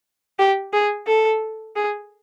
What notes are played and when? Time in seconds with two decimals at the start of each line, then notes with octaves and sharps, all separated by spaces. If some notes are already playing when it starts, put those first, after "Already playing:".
0.39 G4
0.73 G#4
1.07 A4
1.76 G#4